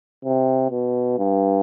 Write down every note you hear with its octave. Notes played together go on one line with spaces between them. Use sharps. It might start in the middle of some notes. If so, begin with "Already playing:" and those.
C3
B2
G2